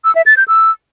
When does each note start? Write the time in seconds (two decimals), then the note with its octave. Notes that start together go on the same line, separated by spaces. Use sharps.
0.04 E6
0.15 E5
0.26 A6
0.37 G6
0.48 E6